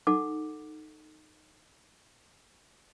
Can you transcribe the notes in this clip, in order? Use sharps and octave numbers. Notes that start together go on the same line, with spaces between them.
D#4 A4 F#5 D6